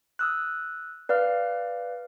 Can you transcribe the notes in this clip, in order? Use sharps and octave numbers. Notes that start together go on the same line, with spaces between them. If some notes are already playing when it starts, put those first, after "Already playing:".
D#6 E6 F#6
B4 D5 F5 F6